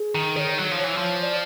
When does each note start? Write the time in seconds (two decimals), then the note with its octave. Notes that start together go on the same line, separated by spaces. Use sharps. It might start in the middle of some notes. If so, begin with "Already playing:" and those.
Already playing: G#4
0.15 D#3
0.36 D#3 C#5 D5
0.58 F#3
0.71 F3
0.80 E3 C#5
0.97 F3
1.22 D5